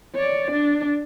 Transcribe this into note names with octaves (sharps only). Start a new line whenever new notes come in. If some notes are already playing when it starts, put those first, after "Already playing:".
C#5 D5
D4